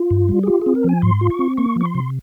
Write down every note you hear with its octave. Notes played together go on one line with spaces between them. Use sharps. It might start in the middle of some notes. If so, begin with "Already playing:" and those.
Already playing: F4
G2
G3
G#4
F4 G4
C4 G#4
A#4
F3 G#5
G#2 C6
F4
C#6
C4
A#3 C#6
F3 C#6
C6
C3